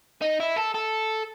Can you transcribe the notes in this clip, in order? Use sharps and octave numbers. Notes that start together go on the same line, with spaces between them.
D#4
E4
A4
A4